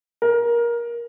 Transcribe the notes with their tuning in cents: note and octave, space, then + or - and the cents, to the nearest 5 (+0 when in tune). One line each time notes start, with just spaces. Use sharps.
A#4 +20